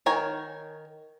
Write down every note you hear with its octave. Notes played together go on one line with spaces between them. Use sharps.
D#3 A#4 C#5 G#5